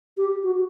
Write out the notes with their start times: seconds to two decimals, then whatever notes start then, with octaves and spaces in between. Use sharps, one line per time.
0.17 G4
0.43 F#4